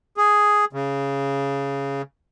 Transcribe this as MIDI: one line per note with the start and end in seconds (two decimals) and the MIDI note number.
0.17 0.65 68
0.73 2.02 49